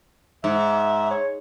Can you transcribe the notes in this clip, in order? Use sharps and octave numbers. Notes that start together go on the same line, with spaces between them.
G#2 E5
C#5